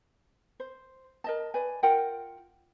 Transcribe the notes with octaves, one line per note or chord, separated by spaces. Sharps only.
C5
A#4 D#5 A5
B4 D5 G#5
F4 A#4 F#5 G5